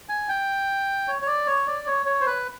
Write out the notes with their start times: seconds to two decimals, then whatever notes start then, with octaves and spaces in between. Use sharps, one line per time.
0.09 G#5
0.29 G5
1.08 C#5
1.22 C#5
1.27 D5
1.47 C#5
1.67 D5
1.87 C#5
2.06 C#5
2.21 C5
2.27 B4